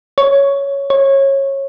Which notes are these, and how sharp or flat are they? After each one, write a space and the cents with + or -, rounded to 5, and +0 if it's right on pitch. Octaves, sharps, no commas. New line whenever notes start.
C#5 +5
C#5 -20